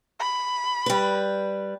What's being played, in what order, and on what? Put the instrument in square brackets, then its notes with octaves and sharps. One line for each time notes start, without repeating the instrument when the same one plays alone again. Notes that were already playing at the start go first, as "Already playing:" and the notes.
[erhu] B5
[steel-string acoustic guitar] G3 B4